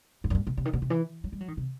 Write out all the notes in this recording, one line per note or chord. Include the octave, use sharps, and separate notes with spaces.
G2
F#2
G2
B2
C3
D#3
B2
C3
E3
F#3
G3
F#3
D#3
C3